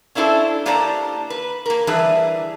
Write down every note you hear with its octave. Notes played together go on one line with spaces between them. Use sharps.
C#4 D4 E4 A4 C5
A#3 D4 G4 C5 D5 A#5
B4
A#3 A#4
E3 G3 D4 G#4 B4 E5